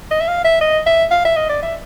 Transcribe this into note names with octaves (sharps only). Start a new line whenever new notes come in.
D#5
E5
F5
E5
D#5
E5
F5
E5
D#5
D5
E5